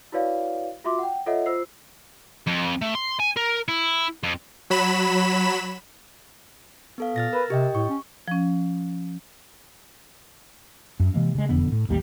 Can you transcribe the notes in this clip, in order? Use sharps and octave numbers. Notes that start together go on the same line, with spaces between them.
E4 F#4 B4 C#5 D5 F5
F4 F#4 E5 C6 D6
F#5 G5
F4 A4 C#5 D#5 E5 F#5
F4 C5 E6 C7
F2
A3
C6
G#5
A#4
E4
F2
F#3 B5 E7
B3 A4 F5
A#2 F6 A6 A#6
A#4 B4
C3 G4 D#5 G5
A2 C#6
C#4
F3 C#4
F#2
C3 E3 G#3 A#3
C#3 G#3
E1 F2 D3 B3
A2
A1 D#2 G3 A#3